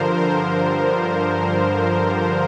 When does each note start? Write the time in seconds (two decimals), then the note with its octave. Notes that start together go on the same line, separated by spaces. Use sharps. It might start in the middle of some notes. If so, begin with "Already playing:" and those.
Already playing: G2 D3 F3 A#4 C5
0.17 A#4 C5